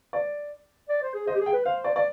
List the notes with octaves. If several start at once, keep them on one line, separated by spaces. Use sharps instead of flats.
D5
D5
C5
G#4
C5 D#5
G4
G#4
G5
B4
C5 F5
D5
D5